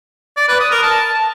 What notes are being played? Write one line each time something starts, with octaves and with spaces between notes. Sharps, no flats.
D5
B4
D#6
A#4
A5